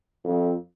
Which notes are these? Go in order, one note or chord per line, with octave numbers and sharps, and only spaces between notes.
F2